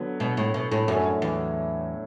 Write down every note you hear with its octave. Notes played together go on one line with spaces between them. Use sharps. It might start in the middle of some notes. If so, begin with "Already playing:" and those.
Already playing: D3 F#3 B3
B2
A2
B2
A2
F#2 A2 F#3 A3 D4
E2